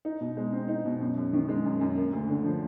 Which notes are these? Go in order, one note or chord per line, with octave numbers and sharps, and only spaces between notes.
D#4
B2
G#3
C4
D#4
B2
F#2
F#2
D#3
G#3
F#2
F#2
A#3
D2
D3
F3